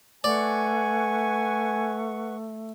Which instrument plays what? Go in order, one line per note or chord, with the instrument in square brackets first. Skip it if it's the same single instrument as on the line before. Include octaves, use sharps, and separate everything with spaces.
[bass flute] A3 [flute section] B4 F#5 C#6 [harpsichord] D5 [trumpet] G#5